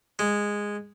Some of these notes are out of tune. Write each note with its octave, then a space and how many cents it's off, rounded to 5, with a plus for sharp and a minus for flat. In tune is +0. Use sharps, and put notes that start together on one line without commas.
G#3 -10